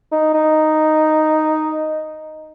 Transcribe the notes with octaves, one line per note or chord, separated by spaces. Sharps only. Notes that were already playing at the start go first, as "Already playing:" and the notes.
D#4
D#4